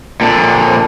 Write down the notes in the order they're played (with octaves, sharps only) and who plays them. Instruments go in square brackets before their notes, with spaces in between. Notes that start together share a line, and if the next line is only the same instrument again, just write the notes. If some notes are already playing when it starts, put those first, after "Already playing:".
[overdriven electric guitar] A#2 D3